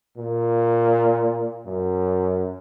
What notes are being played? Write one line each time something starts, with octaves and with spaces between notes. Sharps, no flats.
A#2
F#2